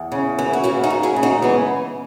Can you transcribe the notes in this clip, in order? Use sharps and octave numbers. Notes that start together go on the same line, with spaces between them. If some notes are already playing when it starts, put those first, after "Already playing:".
Already playing: E2
C#3
E3
F#4
C#3 C#4 E4
D#4 F#4
C#3
E4 G#4
C#3
D#4 F#4
E3 G#3 B3